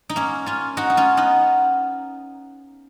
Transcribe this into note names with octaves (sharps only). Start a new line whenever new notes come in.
D#4
A#3 C#4
C#4 F4
D#4 F#4
D#4
C#4 F4
B3 D#4